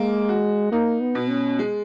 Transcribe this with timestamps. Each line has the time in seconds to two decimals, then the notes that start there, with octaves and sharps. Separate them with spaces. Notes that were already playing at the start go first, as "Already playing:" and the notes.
Already playing: G#3 A#3
0.29 F#4
0.72 A#3 D#4
1.01 B3
1.15 B2
1.30 C#4
1.59 G#3